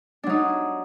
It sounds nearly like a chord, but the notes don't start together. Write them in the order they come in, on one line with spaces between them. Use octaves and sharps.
D4 F#3 D#4